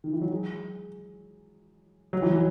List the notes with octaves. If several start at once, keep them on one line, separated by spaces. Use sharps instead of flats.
D#3
E3
F#3
G#3
F#3
E3
F#3